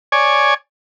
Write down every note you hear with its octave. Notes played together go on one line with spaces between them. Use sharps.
C#5 D5 G#5